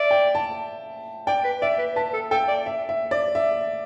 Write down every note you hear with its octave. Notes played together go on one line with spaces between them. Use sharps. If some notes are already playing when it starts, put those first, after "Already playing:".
Already playing: D5 E5
G5
A5
D5 G5
B4
D5 E5
B4
B4 A5
A4
A4 G5
D5
E5
E5
D5
E5